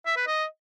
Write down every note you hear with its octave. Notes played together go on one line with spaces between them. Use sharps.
E5
B4
D#5